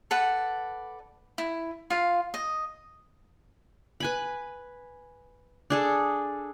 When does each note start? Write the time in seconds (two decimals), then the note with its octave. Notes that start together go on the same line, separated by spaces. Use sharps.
0.11 A4 B4 D5 F#5
1.38 E4
1.90 F4 F5
2.34 D#5
4.00 B4 G#5 B5
5.70 D4 G#4 A4